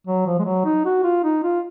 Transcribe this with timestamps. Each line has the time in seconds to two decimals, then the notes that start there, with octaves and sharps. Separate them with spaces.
0.07 F#3
0.26 F3
0.39 G#3
0.45 F#3
0.65 D#4
0.85 F#4
1.04 F4
1.24 D#4
1.44 F4